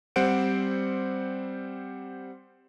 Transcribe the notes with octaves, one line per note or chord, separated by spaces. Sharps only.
G3 C4 C5 F#5 D7